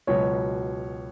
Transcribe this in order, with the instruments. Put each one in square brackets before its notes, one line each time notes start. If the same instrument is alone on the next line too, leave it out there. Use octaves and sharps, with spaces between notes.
[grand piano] C#2 B2 F#3 C#4 C#5